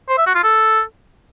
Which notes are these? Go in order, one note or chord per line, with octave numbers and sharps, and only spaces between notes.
C5
E5
F#4
F4
A4